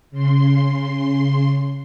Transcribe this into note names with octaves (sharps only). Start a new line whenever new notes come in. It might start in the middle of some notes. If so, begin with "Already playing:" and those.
C#3 C6